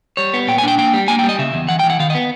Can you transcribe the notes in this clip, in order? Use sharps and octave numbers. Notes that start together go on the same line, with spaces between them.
G3 C#5
B3
A#2 G5
G#5
D4 G5
A#3 G5
G3
A#3 G#5
G5
G3
D#5
C#3 E5
E2
E3 F#5
G5
E3
F#5
D#3 F5
D#5
B3